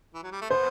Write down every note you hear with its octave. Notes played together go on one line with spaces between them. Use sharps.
E3
F#3
G3
A3
B3 C5